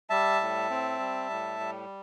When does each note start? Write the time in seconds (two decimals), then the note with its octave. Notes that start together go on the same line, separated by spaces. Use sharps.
0.10 G3 E5 A5
0.41 A2
0.70 C4
0.99 G3
1.30 A2
1.60 G3